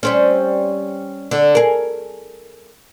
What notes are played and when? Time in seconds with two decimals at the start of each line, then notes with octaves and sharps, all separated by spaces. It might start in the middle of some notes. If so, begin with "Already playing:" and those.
0.03 G3 C4 C#4
1.31 D3
1.55 G#4 A#4